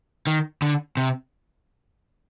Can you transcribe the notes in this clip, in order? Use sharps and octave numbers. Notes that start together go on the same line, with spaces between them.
D#3
D3
C3